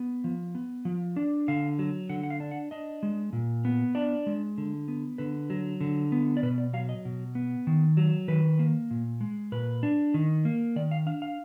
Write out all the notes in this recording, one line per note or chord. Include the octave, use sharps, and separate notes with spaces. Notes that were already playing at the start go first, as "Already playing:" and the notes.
Already playing: B3
F3
B3
F3
D4
D3 F5
F#3
D3 F#5
F#5
F5
D4
F#5
D4 D#5
G#3
A#2
B3
D4 D5
G#3
D3
B3
D3 B4
F#3
D3
B3
D5
B2 B4
D5
F#3 F5
D#5
B2
B3
D#3
F#3
D#3 B4
A#3
A#2
G#3
A#2 B4
D4
D#3
A#3
D#3 D5
F5
D4 F5
F5